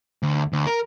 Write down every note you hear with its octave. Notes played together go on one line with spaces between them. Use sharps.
D2
D2
A#4